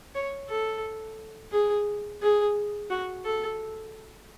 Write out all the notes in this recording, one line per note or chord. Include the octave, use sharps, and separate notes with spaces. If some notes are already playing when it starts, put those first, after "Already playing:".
C#5
A4
G#4
G#4
F#4
A4